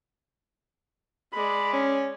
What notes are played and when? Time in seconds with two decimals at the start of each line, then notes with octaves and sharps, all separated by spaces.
1.33 G#3 D5 B5
1.73 C#4